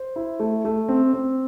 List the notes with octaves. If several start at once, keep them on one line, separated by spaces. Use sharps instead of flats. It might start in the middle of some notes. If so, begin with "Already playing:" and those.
Already playing: C5
E4
A3
A3
C4
C4